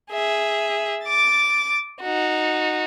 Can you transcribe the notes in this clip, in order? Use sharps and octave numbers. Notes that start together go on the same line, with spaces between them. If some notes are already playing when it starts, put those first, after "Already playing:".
G#4 E5
D6 A6
D#4 F#4